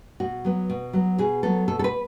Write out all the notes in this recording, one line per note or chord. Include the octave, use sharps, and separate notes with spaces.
B2 F#4
F#3 B3
B2
F#3 B3
B2 G#4
F#3 B3 A4
B2 A4
A4
B4